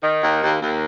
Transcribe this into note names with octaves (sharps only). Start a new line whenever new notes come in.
D#3
D#2
D#2
D#2